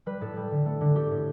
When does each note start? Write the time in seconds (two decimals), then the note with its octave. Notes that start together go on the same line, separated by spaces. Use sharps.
0.06 G3 B4
0.21 A2 A4
0.36 G3
0.51 D3
0.66 A3
0.81 D3
0.96 A3 G4
1.11 A2